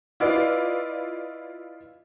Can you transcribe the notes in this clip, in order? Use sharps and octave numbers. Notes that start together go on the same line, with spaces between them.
E4 F4 B4 D5 D#5 F5